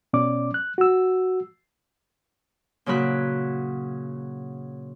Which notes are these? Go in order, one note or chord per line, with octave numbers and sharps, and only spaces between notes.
B2 C#4 D5 D6
F#6
F#4 E6
A#2 C#3 F#3 A#4 B5 F#6